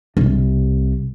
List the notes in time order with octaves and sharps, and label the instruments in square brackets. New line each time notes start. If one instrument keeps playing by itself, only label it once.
[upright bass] C2 C3